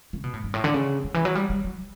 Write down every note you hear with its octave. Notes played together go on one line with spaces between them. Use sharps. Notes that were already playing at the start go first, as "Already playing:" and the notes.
C#3
B2
A2
G2
A2
D3
C#3
D3
E3
F#3
G3
G3
F#3